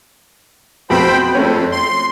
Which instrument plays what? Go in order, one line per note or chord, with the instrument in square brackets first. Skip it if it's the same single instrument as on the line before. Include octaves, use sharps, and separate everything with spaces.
[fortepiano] F2 B2 A3 [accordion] C5 G5 B5
[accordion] F2 [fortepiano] A3 C4 C#4
[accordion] C6